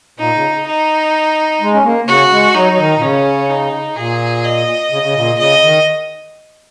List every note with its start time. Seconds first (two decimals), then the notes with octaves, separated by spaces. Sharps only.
0.19 A#2 D#4
0.35 C#3
0.66 D#4
1.61 G#3
1.73 C#4
1.84 A#3
2.08 C#3 F#4
2.31 G#3
2.55 F#3 D#4
2.72 F#3
2.78 D#3
2.97 A#2
3.02 C#3 C#4
3.49 D#4
3.96 A#2 G#4
4.44 D#5
4.91 C#3
5.03 C#3
5.15 A#2
5.38 C#3 D#5
5.62 D#3